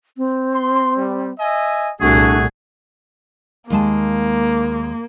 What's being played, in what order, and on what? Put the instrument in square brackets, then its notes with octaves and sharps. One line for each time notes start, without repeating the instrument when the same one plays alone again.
[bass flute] C4
[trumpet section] C6
G3
D#5 E5 G#5
[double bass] C2 A#2 [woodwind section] A3 G#4 [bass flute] D4 [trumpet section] F#4
[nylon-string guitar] D#2 G#3 A5 [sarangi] A#3